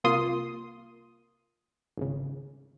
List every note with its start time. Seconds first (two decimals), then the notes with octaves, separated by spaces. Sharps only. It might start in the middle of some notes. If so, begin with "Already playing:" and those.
0.04 C2 A#3 F4 C6 D#6
1.97 G#1 C#2